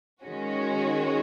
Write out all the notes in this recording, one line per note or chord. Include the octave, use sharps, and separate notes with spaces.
D#3 G#3 C#4 F#4